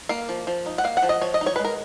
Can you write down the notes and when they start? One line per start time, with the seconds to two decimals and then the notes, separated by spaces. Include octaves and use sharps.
0.09 A#3 F5
0.29 F3
0.47 F3
0.66 D#4
0.78 F#5
0.84 A#3 F5
0.97 F#5
1.03 F3
1.09 D#5
1.21 F3 C#5
1.34 D#5
1.41 D#4
1.46 C#5
1.56 G#3 B4
1.65 A#4